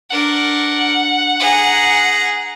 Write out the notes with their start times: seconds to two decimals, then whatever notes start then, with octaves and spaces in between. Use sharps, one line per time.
0.11 D4 A#4 F#5
1.39 G#4 A#5